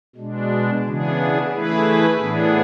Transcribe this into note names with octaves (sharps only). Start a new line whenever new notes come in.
B2 G#3 D4
C#3 E3 B3 D4 G#4
E3 A3 E4 G#4 B4
A2 E3 B3 D4 G#4